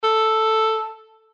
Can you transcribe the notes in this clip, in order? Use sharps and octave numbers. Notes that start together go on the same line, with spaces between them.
A4